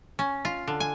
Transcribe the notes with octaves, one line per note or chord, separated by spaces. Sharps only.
C#4
F4
D3
G#5